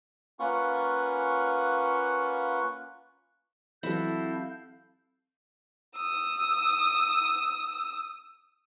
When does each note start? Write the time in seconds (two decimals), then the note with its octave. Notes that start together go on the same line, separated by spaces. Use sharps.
0.40 A#3 C#4 F4 B4 F#5 C#6
3.83 E3 F#3 C4 E4 F#4 A4 F5 G6
5.97 D#6 E6